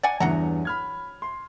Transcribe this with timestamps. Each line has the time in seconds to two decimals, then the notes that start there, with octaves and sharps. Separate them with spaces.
0.03 D5 F#5 G#5
0.20 E2 G2 E3 F#3 F#5 A#5
0.65 B5 F6 G#6
1.22 C6